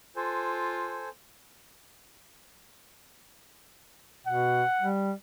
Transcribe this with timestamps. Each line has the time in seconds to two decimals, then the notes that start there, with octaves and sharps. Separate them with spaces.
0.16 F4 A4 C5 G#5
4.26 B2 F#5
4.81 G3